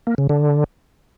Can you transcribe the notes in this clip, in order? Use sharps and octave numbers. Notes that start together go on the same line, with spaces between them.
A#3
C#3
D3